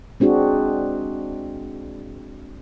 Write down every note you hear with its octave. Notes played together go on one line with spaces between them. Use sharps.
G#3 C4 D4 F#4 G#4